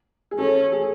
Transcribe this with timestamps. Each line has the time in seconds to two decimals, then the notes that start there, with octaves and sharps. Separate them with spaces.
0.31 G#4
0.39 C#4 A4
0.72 G#4